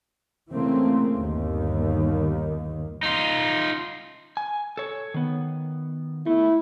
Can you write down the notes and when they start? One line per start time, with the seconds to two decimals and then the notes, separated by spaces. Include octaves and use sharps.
0.51 C#3 E3 A3 A#3 C4
1.15 G1 D#2 D#3
3.03 D#4 F4
4.37 G#5
4.77 A4 C#5
5.14 D#3 B3
6.26 A3 E4